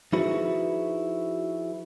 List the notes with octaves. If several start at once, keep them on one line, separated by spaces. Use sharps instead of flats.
F3 D#4 E4 F#4 G#4 B4